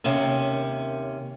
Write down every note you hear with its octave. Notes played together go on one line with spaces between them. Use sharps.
D#2 C3 A#3 C#4